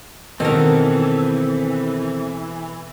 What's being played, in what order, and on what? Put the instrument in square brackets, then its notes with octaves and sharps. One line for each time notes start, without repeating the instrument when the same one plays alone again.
[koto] B2 A#4 [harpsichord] D#3 [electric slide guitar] E3 [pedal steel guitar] C4 A4